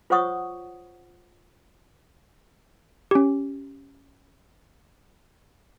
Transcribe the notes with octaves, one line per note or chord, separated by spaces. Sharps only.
F4 C5 C#5 F#5 C#6 D#6
C#4 G4